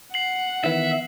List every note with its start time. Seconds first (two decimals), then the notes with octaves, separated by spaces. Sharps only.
0.14 F#5 C7 F#7
0.64 D#3 E3 B3 E5